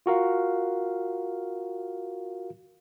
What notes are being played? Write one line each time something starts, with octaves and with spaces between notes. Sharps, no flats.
F4 F#4 A#4 F5